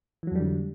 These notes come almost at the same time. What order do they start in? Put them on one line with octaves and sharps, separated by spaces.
E3 F#3 F2 G3 D3